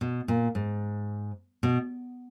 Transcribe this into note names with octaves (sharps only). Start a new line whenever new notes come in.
B2
A#2
G#2
B2